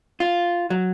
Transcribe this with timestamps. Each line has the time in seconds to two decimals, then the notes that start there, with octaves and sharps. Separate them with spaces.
0.20 F4
0.70 F#3